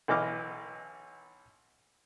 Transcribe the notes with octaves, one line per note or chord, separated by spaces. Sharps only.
B1 E3 D#5 D6 F6